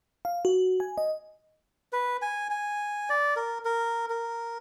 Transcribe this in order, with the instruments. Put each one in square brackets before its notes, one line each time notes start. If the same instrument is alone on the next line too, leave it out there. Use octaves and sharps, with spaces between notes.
[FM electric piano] F5
F#4
G#5
D#5
[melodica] B4
G#5
G#5
D5
A#4
A#4
A#4